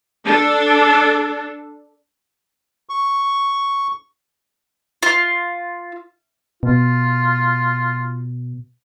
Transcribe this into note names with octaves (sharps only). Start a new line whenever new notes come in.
D4 A4
C#6
F4
B2 F4